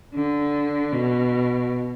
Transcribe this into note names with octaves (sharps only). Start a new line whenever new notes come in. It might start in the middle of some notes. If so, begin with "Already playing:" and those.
D3
B2